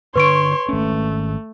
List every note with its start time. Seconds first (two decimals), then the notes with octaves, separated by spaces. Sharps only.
0.16 G2 D3 B4 C#5 C6 C#6 D7
0.69 G#1 A3 C#4